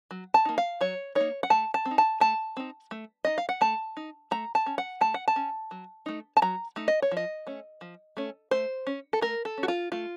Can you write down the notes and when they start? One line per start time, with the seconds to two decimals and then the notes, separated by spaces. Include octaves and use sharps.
0.11 F#3
0.34 A5
0.45 A#3 D#4
0.58 F5
0.81 F#3 C#5
1.15 A#3 D#4 C#5
1.43 F#5
1.50 A3 A5
1.74 A5
1.85 C4
1.91 D#4
1.98 A5
2.20 A3 A5
2.57 C4 D#4
2.91 A3
3.25 D#4 D#5
3.38 F5
3.49 F#5
3.61 A3 A5
3.97 D#4
4.31 A3 A#5
4.55 A5
4.66 C#4
4.78 F#5
5.01 A3 A5
5.14 F#5
5.28 A5
5.36 C#4
5.71 F#3
6.06 A3 D#4
6.37 A5
6.42 F#3 A#5
6.76 A3 D#4
6.88 D#5
7.02 C#5
7.11 F3
7.17 D#5
7.47 A3 C#4
7.81 F3
8.17 A3 C#4
8.51 A3 C5
8.87 C#4
9.13 A4
9.21 A3 A#4
9.45 A4
9.58 C#4
9.63 F#4
9.68 F4
9.92 A3 F4